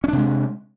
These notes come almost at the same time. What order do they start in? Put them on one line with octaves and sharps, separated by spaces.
C#4 D4 C3 G#3